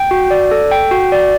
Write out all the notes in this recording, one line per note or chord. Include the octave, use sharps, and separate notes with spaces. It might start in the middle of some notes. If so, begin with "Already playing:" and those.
Already playing: G5
F#4
D5
A4
G5
F#4
D5